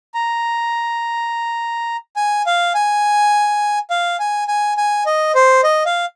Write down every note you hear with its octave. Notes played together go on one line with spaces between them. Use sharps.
A#5
G#5
F5
G#5
F5
G#5
G#5
G#5
D#5
C5
D#5
F5